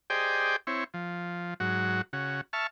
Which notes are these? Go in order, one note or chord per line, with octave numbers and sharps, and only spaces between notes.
G4 G#4 C5 D5 D#5 G5
C4 E4 C#5
F3
G#2 F#3 F#4
C#3 F#4
E5 A5 C#6 F6